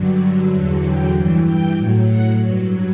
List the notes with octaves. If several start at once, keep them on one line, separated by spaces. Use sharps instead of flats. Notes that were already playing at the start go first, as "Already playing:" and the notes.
Already playing: G2 D3 F#3
E2 D3 F#3
G5
G2 E3
G5
A2 F#3
F#5
G2 F#3